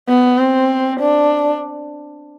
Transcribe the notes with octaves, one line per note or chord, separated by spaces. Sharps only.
B3
C4
D4